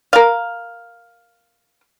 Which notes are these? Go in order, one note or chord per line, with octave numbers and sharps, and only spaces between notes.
A#4 F5